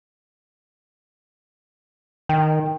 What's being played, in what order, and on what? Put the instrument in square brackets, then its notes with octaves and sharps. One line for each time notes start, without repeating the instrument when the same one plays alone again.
[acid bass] D#3 [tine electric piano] G5